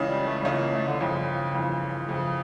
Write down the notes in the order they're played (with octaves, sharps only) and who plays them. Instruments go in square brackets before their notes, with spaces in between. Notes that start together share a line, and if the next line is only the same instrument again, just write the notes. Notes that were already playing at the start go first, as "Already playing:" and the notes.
Already playing: [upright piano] C#2 C#3 E3
[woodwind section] G3
A3
G3
[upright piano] C#2 C#3 E3 [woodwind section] A3
[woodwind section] A#3
A3
D3
[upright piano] G1 F2 E3 [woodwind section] C#3
[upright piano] G1 F2 E3
[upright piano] G1 F2 E3 [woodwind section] C#3